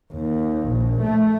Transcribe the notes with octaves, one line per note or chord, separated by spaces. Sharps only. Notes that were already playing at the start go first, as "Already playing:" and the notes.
D#2
A#1
A3